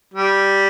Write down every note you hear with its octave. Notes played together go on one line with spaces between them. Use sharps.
G3